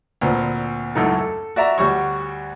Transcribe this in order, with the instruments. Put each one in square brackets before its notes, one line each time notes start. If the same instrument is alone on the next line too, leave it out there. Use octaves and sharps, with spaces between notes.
[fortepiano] D2 A#2 C4 B4
C#2 F#2 A2 F#3 D#4 A4
A4
F#4 D5 E5 A#5
D2 G3 F#4 C#5 C#6